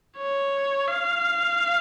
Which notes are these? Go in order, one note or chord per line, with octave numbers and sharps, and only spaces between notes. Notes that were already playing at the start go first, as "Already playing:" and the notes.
C#5
F5